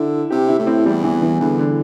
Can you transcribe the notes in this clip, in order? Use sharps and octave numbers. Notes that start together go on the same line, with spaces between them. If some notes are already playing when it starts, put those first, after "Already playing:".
Already playing: D3 E4
C3 G4
E4
A2
C4
E2 G3
E3
E3
E2 D3
D3